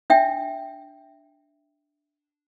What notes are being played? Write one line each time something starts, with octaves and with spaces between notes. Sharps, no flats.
D4 E5 G5